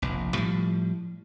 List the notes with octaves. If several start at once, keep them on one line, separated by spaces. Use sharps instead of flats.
F1 A#1
A2 F3 G3